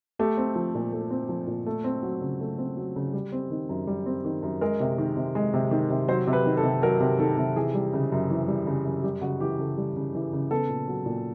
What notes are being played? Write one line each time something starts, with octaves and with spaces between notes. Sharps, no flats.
A3 G4
C4
F3
A#2
A3
C4
F3
A#2
A3
C4
F#3
C#3
A3
C4
F#3
C#3
G3
C4
D#3
F#2
G3
C4
D#3
F#2
G#3 A#4
C3
D#3
C3
G#3
C3
D#3
C3
F#3 C5
C3
B4
D#3
A4
C3
F#3 A#4
C3
D#3 A4
C3
E3 G#4
G3
C#3
F#2
E3
G3
C#3
F#2
G3 G4
C#3 F#4
E3 G4
C#3 A4
G3
C#3
E3
C#3
B3 A4
A#2
F#3
A#2